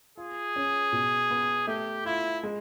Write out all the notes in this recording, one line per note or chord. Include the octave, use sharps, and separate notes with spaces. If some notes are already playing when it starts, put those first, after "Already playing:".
F4 G#4
C#4
B2
B3
A3 G4
E4 F4
G#3